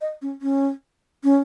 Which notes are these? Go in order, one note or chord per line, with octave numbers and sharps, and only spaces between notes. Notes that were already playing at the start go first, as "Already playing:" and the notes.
D#5
C#4
C#4
C#4